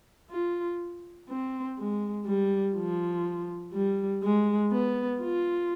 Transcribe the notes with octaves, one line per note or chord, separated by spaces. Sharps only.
F4
C4
G#3
G3
F3
G3
G#3
B3
F4